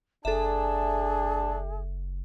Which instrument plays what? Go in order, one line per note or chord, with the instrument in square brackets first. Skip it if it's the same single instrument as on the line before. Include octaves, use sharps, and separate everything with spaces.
[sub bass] F#1 [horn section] D4 A5 [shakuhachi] G#4 [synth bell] A4 E5